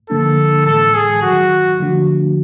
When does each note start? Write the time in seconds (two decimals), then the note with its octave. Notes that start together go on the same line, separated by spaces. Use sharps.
0.10 G2 D3 F3 A#3 D4 A4
0.66 A2 E3 G#3 A4
0.95 G#4
1.22 G2 D#3 F#3 F#4
1.79 D3 F3 A3 D4 F#4